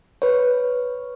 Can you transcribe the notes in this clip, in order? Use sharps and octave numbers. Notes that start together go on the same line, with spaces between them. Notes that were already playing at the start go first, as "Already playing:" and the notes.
B4 C#5